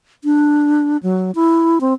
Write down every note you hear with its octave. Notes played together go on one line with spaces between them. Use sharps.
D4
F#3
E4
C4